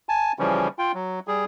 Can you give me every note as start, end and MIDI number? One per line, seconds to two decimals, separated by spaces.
0.09 0.32 80
0.09 0.32 81
0.39 0.68 49
0.39 0.68 52
0.39 0.68 53
0.39 0.68 55
0.39 0.68 61
0.79 0.92 65
0.79 0.92 79
0.94 1.20 54
1.28 1.45 55
1.28 1.45 68